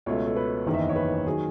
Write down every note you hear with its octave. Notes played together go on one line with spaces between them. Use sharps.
C#2 B2 A3 C#5
A4
B4
F#1 E2 D#3
E5
D#5
C#5
B4
D#3 F#3 G#4